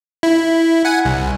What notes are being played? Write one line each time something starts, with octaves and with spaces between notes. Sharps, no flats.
E4
F#5 G#5
C2